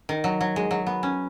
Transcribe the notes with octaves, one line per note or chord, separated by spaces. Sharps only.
D#3
F#3
F#3
G#3
F#3
B3
C#4